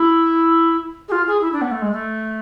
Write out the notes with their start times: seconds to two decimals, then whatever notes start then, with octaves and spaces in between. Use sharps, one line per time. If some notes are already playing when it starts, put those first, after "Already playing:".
Already playing: E4
1.08 G#4
1.12 F4
1.27 G#4
1.41 E4
1.52 D4
1.61 B3
1.71 A3
1.82 G#3
1.92 A3